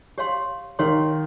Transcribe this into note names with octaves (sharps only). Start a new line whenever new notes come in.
G4 C#5 F5 C6
D#3 G4 C#5 F5 C6